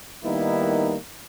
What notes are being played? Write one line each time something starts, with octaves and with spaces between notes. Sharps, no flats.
D#3 G3 A#3 B3 D#4 E4